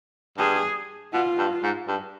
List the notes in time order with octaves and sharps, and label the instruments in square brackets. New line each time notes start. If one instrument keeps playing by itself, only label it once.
[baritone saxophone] G2 [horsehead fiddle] G#4
[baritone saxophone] B2 [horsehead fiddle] F4
[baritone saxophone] G2
G#2
G2